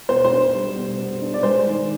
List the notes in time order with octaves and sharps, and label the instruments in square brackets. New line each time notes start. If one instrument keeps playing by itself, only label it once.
[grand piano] B2 [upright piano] C5
[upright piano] C5
[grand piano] D4
G3
B2
B2
D4
[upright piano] D5
[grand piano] G#3 [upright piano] C5
[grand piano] D#3